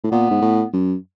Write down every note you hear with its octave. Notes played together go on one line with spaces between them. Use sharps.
A2
A#2 B3
G#2
A2
F#2